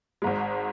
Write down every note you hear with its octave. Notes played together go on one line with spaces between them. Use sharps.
G#1 G#2 G#3